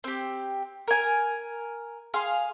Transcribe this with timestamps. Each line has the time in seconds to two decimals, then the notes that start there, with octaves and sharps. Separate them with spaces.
0.04 C4 G4
0.88 A#4 G#5
2.14 G#4 F5 C6